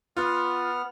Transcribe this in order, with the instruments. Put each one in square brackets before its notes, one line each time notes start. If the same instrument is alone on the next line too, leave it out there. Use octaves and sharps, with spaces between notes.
[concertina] B3 F#5 F6 [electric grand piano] F4